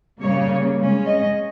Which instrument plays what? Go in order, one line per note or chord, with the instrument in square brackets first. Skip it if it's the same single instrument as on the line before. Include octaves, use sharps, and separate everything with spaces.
[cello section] C#3 G3 A#3 C#5
C#3 G#3 C#4
D#5